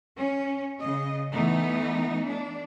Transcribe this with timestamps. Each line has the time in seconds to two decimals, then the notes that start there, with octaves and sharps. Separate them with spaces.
0.18 C#4
0.79 C#3 D#5
1.31 E3 A3 B3 D#4
2.26 D4